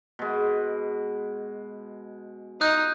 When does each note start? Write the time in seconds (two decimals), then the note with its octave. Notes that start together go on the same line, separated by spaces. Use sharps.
0.19 B2 G#3
2.61 D#4 F4 D#6 F#6 G6